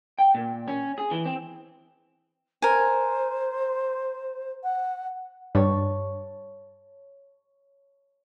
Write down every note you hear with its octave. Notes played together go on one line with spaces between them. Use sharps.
G5
A#2
C#4
G#4
E3
C4
A#4 C5 G#5
F#5
G2 C#5 A5